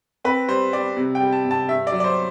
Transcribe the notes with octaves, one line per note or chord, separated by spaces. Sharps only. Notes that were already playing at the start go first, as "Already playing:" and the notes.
C4 B4
G3 C5
G3 D5
C3
G5
G3
A5
C3
A5
G2 E5
D5
F#3
D5
C5